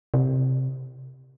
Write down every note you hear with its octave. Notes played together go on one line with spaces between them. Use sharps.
C3